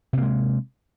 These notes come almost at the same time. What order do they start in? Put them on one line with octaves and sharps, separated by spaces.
C3 A#3 G#3